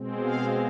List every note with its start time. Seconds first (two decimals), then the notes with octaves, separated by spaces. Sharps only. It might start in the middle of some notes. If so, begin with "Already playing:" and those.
Already playing: B2 G#3 C4
0.23 F5